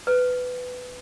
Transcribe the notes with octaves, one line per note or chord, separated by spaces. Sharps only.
B4